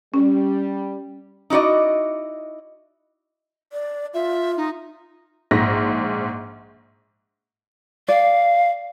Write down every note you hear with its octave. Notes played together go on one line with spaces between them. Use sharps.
G3 C#4
D#4 E4 F#4 D5 D#5
D5
F4 E5
D#4
A#1 G#2 A#6 B6
D5 F5